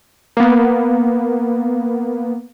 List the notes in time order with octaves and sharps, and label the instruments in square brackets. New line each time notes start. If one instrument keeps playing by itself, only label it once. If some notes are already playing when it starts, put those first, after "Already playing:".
[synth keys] A#3 B3